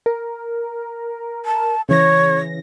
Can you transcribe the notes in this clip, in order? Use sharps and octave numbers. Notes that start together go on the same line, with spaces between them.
A#4
A5
C#3 E3 C#5 A#6